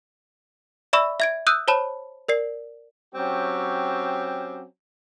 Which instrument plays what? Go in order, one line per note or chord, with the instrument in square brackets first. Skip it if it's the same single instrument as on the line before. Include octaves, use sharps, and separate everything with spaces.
[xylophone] D5 E5 B5 C#6 E6
E5 G#6 D7
D#6 E6 F#6 G6 D#7
C5 C#5 A5 B5
A#4 D5 C7
[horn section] F#3 C4 C#4 G4